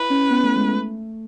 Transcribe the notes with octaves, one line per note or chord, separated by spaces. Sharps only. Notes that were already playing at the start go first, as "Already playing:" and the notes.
Already playing: E4 B4
C#4
B3
A3
G#3
A3